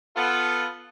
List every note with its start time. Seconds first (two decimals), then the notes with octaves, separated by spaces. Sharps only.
0.16 B3 F4 A4